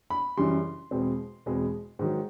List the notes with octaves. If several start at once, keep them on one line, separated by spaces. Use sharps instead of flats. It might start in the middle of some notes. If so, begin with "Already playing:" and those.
B5
F#2 C#3 E3 G3 C6
E2 B2 G#3 C4
E2 B2 G#3 C4
G#2 D#3 F#3